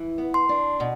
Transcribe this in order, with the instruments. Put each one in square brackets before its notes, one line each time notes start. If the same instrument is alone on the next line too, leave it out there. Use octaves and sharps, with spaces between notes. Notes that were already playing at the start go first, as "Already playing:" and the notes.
Already playing: [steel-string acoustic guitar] E3
B3
[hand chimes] C6
[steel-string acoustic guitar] D4
B2